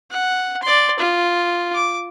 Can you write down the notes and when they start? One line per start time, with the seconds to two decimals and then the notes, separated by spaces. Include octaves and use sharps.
0.11 F#5
0.62 D5 C6
0.99 F4
1.74 D6